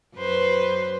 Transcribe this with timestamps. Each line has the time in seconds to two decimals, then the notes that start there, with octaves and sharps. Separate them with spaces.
0.17 F#2 B4 C5